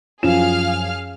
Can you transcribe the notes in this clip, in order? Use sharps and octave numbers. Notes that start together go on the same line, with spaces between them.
F#2 F3 G#4 F5 F6 E7